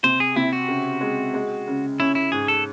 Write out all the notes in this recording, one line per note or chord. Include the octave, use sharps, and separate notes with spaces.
C3 C5
G#4
C3 E4
F#4
C#3
G#3
G#3
C#3
C#4 E4
E4
G#2 G#4
A4